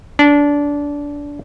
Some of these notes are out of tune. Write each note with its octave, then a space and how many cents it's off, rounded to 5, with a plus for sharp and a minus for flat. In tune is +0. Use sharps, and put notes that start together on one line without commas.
D4 -20